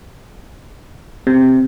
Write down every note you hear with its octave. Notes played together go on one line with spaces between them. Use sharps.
C3